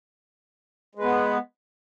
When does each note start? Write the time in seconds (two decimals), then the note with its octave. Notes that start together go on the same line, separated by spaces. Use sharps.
0.95 G#3
0.99 B4
1.03 B3